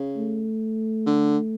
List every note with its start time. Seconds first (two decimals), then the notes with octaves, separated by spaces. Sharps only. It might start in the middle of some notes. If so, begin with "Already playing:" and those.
Already playing: C#3
0.17 A3
1.06 D3